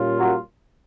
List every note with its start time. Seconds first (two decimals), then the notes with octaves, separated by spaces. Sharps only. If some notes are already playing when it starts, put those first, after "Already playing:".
Already playing: A#2 G3 A#3 C#4 F4
0.18 F#2 F#3